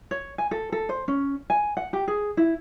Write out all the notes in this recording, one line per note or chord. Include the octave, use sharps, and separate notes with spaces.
C#5
G#5
A4
A4
C5
C#4
G#5
F#5
G4
G#4
E4